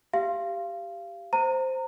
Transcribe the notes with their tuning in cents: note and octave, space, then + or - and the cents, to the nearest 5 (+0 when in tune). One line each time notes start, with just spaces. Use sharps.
G4 +0 F5 -25
C5 +0 A#5 -25